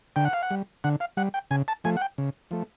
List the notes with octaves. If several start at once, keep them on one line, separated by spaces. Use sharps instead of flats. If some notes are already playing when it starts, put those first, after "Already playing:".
D3 G5
F#5
F5
F#5
G3
D3 F#5
F5
G3 F#5
G5
C#3 G#5
A5
F3 A3 G#5
F#5
G5
C#3
F3 A3